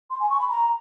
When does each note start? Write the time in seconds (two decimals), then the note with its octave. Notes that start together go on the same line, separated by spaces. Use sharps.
0.10 C6
0.20 G#5
0.30 C#6
0.40 B5
0.49 A#5